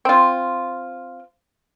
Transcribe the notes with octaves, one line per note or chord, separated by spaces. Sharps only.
C4 F4